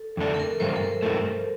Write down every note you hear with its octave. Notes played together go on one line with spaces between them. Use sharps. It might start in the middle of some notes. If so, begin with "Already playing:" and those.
Already playing: A4
F2 D3 A3 D4
A4
A#4
G2 F3 A3 C5
A#4
A4
A#4
G2 F3 A3